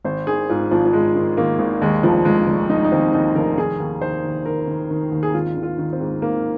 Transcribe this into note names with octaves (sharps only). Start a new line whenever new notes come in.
G#1 C5
D#3 G#4
G#2 F4
G#1 F3
F3
G#2 G#3
D#3
D#3 A#3
G#1
D#2 G#3
F1 F3
F1 G#3
F1
F1 D#4
D#4
D#2 C4
D#2 D#4
F1 A#4
D#3 G#4
D#2
D#3 C5
D#2
D#3 A#4
D#3
D#3
D#2
G#4
G#1 F4
D#3
F4
D#3
C4
G#2
D#3 A#3